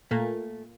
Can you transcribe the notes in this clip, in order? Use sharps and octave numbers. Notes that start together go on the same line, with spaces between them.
A#2 A3 A#3